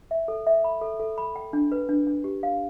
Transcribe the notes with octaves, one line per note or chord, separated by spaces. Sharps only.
E5
A4
E5
B5
A4
A4
B5
G5
D4
B4
D4
D4
G4
F5